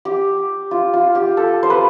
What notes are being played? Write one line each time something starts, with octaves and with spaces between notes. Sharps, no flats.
G4
F4
F4
G4
A4
C5
B4